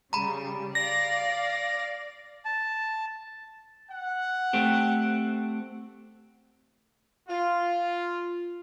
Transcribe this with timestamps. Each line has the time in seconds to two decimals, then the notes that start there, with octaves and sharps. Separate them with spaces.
0.13 C#3 G3 A#5 B5
0.75 D5 F5 A#6
2.45 A5
3.89 F#5
4.53 A3 C4 G4
7.29 F4